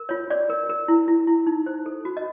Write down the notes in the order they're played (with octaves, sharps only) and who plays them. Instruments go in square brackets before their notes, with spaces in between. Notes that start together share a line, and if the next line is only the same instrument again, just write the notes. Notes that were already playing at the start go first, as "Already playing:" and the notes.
Already playing: [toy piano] A#4
F4 C#5
C#5 D5
A#4
A#4
E4
E4
E4
D#4
C5
A4
F#4
D#5